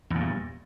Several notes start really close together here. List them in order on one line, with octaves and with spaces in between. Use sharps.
E2 A#2 G2